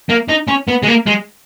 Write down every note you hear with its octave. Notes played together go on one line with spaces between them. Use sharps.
A#3
D#4
C#4
B3
G#3
A#3
G#3